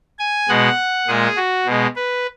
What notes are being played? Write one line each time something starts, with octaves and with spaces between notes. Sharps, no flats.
G#5
B2 G#3 F#5
A#2 G#3 G#4
F#4
B2 G#3
B4